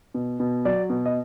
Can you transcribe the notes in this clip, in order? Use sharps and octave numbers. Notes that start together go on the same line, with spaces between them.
B2
B2
F#3 D5
B2
D#5